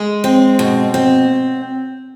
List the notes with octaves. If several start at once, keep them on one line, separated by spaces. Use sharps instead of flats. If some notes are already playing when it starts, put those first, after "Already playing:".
Already playing: G#3 G#4
C4
B2
C4